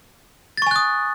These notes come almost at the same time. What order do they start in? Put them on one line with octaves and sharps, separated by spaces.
A6 C#6 G#5 F#6 D#6